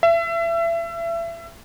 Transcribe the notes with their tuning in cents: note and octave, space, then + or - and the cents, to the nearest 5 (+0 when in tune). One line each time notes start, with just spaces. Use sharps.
E5 +30